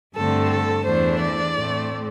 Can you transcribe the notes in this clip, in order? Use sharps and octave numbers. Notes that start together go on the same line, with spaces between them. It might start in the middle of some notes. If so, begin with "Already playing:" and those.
G2 D3 A3 C4 A4
A4
E2 E3 A3 D4 C5
D5
A2 A3 C4